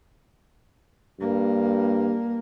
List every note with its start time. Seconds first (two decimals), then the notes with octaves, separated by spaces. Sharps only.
1.20 G2 A#3